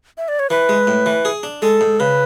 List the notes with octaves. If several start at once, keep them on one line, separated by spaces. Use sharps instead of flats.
E5
D5
C#5
E3 B4
G#3
A2
E3
G#4
D4
G#3 A4
G#2
C#3 B4